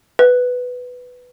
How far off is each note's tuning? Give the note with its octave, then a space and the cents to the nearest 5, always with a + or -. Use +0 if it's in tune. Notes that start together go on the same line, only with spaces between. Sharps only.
B4 +5